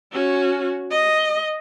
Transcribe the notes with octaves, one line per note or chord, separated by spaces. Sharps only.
C#4 F#4
D#5